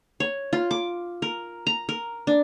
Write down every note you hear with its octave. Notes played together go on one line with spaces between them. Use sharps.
C#5
F4
D6
A#4
A#5
A#4
D4